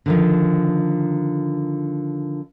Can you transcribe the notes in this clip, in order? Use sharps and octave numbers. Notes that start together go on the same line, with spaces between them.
D3 D#3 F3